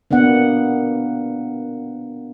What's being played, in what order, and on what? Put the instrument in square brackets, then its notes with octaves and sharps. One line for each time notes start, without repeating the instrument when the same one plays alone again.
[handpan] A#3 B3 D4 F#5